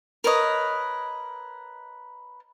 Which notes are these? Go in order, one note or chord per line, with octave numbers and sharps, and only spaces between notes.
A#4 B4 C#5 D#5